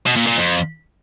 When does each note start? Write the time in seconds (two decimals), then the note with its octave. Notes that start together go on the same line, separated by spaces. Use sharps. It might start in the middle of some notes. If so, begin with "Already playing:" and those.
0.06 B2
0.17 A#2
0.27 A#2
0.37 F2